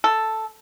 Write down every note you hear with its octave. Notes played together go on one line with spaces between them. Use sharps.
A4